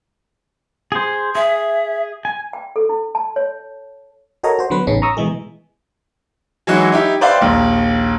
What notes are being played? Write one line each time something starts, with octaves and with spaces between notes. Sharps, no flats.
G#4 C5
G#4 E5
G#5
G5
A4
E4
A5
C#5
F#4 A4 A#4 C#5 D#5 A#5
F#4 C5
D3 F#3 B3 B4
A1 C#3 B3 C#4 D#4
A#5 C#6 D#6 E6
B2 E3 G#3 G#4
E3 F#3 G#3 D#4 E4 F#4
D#4 E4 G4
B4 C5 D5 E5 F5 G5
A#1 D#2